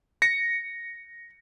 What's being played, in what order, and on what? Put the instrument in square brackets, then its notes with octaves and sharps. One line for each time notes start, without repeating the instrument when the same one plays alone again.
[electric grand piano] A#6 C#7